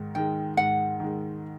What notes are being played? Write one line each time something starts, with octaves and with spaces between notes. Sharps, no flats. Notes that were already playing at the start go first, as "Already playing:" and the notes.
Already playing: G#2 D#3
D#3 G#3 G5
G#2 F#5
D#3 G#3